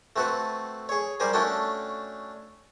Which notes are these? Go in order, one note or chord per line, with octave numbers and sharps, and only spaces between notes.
A3 C4 F#4 A4 B4
G#4 C#5
G3 G4 A#4 C5 G#5
A3 C#4 D4 F#4 A4 G5